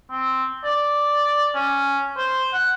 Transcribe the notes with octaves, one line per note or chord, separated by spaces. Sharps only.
C4
D5
C#4
C5
F#5